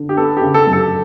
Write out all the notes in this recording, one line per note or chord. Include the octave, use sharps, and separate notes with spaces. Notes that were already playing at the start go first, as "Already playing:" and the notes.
Already playing: D3
G4
B3 A4
G4
C#3
A4
F#2
A4